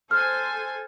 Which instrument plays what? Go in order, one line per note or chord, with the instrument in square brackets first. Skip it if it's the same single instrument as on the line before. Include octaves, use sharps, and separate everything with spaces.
[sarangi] A4 [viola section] C5 G#5 [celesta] F6